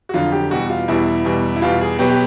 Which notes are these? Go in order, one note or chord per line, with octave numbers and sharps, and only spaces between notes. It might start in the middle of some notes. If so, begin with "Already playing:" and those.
F#4
F2 D3 F#3 F4
G4
E2 B2 G3 F#4
F4
E2 B2 G3 E4
E2 B2 G3
E4
E2 B2 G3 F4
G#4
B2 F#3 B3 G4
G4